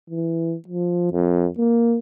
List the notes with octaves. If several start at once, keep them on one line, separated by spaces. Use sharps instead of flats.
E3
F3
F2
A#3